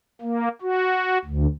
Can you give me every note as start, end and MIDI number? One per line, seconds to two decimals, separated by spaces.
0.21 0.49 58
0.62 1.18 66
1.25 1.46 38